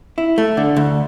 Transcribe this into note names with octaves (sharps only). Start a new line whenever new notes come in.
E4
A3
D3
D2